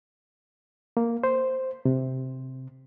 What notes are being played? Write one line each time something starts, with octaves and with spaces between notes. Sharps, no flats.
A#3
C5
C3